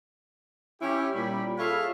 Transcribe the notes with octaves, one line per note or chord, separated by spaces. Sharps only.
C#4 E4 G4
A#2 G3 B5
F4 G#4 A4 C#5 E5 F5